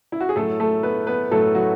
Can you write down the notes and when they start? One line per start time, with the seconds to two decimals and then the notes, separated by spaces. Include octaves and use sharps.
0.12 E4
0.21 F#4
0.29 G#4
0.36 A2 F#3 A3 A4
0.60 A3 A4
0.83 B3 B4
1.07 B3 B4
1.31 A2 F#3 A3 A4
1.55 F#3 F#4